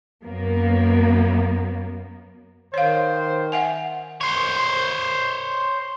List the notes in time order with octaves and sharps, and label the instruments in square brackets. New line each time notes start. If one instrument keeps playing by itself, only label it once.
[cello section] F#2 A#3 B3
[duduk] D#3 [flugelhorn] C5 [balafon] C#5 F5
[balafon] E5 F#5 G#5
[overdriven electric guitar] C5 C#5